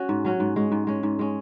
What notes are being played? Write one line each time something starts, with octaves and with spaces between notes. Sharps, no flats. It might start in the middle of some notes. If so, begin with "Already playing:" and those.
Already playing: C#4 F#4
G#2
F#3 C#4 F#4
G#2
G#3 C#4
G#2
G#3 C#4
G#2
G#3 C#4